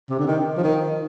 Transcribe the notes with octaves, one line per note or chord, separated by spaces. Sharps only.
C3
D3
D#3
F3
D#3